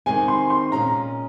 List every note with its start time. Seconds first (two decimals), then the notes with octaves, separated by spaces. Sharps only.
0.06 C3 D#3 G#3 C4 G#5
0.28 C6
0.50 C6
0.72 A#2 G#3 C#4 A#5